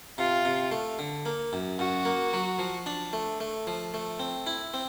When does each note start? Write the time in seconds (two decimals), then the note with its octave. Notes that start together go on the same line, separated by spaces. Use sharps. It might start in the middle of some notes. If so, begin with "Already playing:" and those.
0.18 C3 F4
0.45 C3
0.72 A3
0.99 D3
1.26 A#3
1.53 F#2
1.79 F#2 F#4
2.05 A#3
2.33 F#3
2.59 F3
2.86 D4
3.13 A3
3.40 A3
3.67 F3
3.94 A3
4.19 C4
4.47 E4
4.74 C4